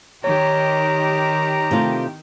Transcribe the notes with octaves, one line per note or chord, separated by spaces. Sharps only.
D#3 G4 C#5 A#5
C3 A3 F4